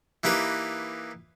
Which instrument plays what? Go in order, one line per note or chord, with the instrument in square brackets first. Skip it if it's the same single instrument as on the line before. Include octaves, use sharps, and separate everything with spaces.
[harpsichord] E3 A#3 D#4 G4 B4